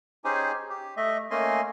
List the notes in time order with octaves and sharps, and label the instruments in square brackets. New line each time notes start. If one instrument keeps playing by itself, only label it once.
[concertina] C#4 D#4 G4 G#4 C5 G#5
G4
A3 D#5 E5
A3 A#3 C#4 D#5 G#5 C6